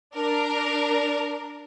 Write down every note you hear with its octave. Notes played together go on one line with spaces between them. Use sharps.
D4 A#4